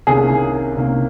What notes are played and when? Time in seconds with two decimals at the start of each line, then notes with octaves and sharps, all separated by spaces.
0.07 C2 C3 D#3 A#3 C#4 G#4
0.76 C2 C3 D#3 A#3 C#4